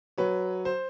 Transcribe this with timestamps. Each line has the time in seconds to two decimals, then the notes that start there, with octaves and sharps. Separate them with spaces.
0.18 F#3 B4 C#5
0.65 C5